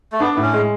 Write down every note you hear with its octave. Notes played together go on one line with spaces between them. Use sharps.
A3
B3 D4
A2 B3
C#4
G#3